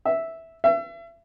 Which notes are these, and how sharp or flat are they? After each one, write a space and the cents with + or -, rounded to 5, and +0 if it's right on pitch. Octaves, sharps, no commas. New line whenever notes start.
E5 -5
E5 +35